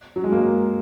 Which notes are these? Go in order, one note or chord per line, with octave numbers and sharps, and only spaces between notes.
F#3
G#3
A#3